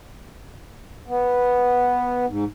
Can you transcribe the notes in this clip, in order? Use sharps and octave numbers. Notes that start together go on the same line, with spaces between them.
B3
G#2